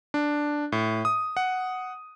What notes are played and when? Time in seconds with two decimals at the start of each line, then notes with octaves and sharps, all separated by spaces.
0.14 D4
0.72 A2
1.05 D#6
1.37 F#5